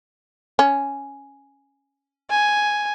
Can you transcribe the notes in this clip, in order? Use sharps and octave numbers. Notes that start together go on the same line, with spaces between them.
C#4
G#5